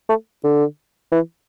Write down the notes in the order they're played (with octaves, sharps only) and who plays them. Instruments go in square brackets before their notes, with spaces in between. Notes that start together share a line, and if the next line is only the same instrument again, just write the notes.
[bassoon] A3
D3
E3